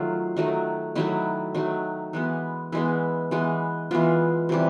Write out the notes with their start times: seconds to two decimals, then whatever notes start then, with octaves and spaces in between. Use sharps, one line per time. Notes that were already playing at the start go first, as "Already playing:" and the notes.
Already playing: D#3 F#3 A3 F4
0.36 D#3 F#3 A3
0.95 D#3 F#3 A3 E4
1.55 D#3 F#3 A3
2.13 E3 G#3 B3
2.72 E3 G#3 B3 E4
3.31 E3 G#3 B3
3.91 E3 G#3 B3 F4
4.49 C3 E3 G3